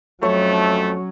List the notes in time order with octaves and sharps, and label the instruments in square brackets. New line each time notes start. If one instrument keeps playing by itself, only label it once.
[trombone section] F2 A3 [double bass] F#3 C#4 [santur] C#5